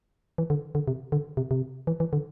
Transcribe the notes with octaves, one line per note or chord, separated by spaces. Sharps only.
E3
D3
D3
C3
D3
C3
C3
E3
E3
D3